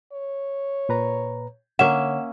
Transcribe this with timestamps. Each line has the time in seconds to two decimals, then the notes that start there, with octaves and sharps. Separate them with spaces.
0.12 C#5
0.89 A#2 B4 A#5
1.79 D3 A#3 C#4 C#5 E5 F#5 E7